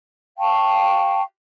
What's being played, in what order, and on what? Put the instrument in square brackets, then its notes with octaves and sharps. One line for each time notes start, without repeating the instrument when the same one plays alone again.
[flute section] F5 G5 A5 C#6